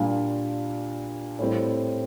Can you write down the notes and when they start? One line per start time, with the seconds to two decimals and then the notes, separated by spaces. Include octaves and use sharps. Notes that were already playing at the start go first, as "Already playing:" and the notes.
Already playing: A#2 G3 D4 F4
1.39 A2 G3 C4